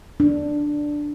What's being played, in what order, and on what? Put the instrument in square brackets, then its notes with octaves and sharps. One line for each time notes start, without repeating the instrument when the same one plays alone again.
[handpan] D4